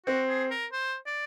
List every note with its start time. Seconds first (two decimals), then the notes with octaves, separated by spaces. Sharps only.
0.06 C4 F#4
0.29 G#4
0.51 A#4
0.73 C5
1.06 D5